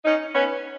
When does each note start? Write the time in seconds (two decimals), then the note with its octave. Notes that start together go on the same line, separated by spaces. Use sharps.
0.05 C#4 D#4
0.34 B3 C#4